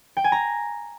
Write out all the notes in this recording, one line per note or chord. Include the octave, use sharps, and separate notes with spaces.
G5
G#5
A#5